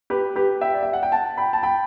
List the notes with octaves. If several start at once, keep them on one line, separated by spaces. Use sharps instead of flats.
G4 B4
G4 B4
E5 G5
D5
E5
F#5
G5
F#5 A5
G5 B5
A5
G5 B5